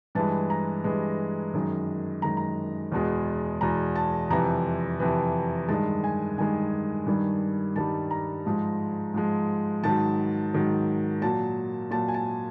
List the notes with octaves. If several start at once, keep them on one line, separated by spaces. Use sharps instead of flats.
G2 E3 G#3 A5
A#5
G2 E3 G#3
F#2 D#3 G#3
F#2 D#3 G#3 A#5
A#5
E2 B2 G#3
E2 B2 G#3 A#5
A5
F2 C3 E3 A#5
F2 C3 E3
G2 D#3 G#3 A5
G#5
G2 D#3 G#3 G#5
G2 D#3 G3
G2 D#3 G3 A5
A#5
G#2 F3 G#3
G#2 F3 G#3
G#2 D#3 F#3 A5
G#2 D#3 F#3
A#2 F#3 A5
A#2 F#3 A5
G#5
A5